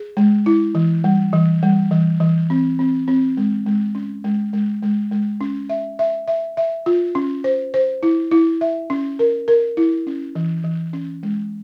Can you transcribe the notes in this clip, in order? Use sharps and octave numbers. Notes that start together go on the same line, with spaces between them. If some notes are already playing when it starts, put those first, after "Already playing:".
Already playing: G#4
G#3
E4
E3
G3
E3
G3
E3
E3
C4
C4
C4
G#3
G#3
C#4
G#3
G#3
G#3
G#3
C#4
E5
E5
E5
E5
F4
C#4
C5
C5
E4
E4
E5
C#4
A#4
A#4
E4
C#4
E3
E3
C#4
G#3